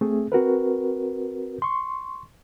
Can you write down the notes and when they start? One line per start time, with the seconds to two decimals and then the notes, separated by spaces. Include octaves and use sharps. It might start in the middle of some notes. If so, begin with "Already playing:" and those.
0.01 A3 C4 G#4
0.32 C4 F#4 A#4 B4
1.62 C6 C#6